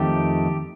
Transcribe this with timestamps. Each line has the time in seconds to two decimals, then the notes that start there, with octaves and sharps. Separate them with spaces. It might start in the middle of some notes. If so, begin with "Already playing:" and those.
Already playing: F2 D#3 A3 G4